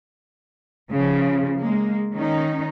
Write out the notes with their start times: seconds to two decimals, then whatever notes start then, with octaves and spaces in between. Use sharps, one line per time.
0.92 C#3 F3
1.58 G#3 A#3
2.14 D#3 C#4 D#4